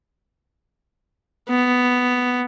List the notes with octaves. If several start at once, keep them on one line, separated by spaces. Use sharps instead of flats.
B3